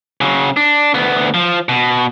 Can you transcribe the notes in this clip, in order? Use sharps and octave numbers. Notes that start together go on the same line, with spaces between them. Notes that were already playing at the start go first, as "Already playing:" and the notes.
C#3 F#3
D4
D2 B3
F3
B2